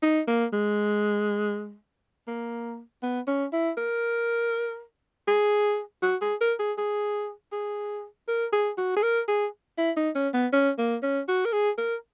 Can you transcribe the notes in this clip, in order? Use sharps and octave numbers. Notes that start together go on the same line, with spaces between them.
D#4
A#3
G#3
A#3
B3
C#4
E4
A#4
G#4
F#4
G#4
A#4
G#4
G#4
G#4
A#4
G#4
F#4
G#4
A#4
G#4
E4
D#4
C#4
B3
C#4
A#3
C#4
F#4
A#4
G#4
A#4